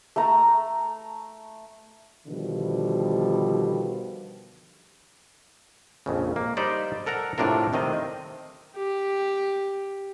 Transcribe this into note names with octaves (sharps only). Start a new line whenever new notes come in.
A3 A4 A#5
B2 D3 D#3 F3 G3
A#1 F2 C#3
A#3
G3 D#4 G4 C5 D5
A4 A#4 F#5 A#5
A2 C3 D4 F4 A#4
C3 D#3 C4 D#5
G4